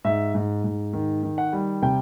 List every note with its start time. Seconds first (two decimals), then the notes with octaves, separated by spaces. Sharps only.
0.04 G#2 E5
0.34 G#2
0.64 G#2
0.93 D#3
1.23 D#3
1.38 F#5
1.53 G3
1.82 C3 G5